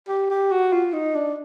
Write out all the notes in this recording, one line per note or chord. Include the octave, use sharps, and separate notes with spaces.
G4
G4
F#4
F4
D#4
D4